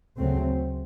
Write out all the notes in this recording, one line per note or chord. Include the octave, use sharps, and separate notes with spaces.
D2 C#3 F#3 A3 C4